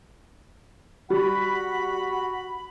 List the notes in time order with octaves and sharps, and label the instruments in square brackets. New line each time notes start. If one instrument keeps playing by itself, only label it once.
[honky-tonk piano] G3 [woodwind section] F#4 B5